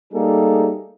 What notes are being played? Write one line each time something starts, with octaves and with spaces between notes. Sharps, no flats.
G3 A3 A#3 D#4 G#4 A4